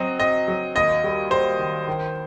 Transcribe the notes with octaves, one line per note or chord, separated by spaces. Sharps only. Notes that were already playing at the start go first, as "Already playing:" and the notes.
Already playing: F#3 C4 D#5
C4 D#5
F#3
D#2 D#5
G3
G3 C5
D#3
D#3